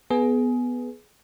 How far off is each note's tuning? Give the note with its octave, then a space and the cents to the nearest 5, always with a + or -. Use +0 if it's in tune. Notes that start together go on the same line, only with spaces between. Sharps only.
B3 +0 G#4 +20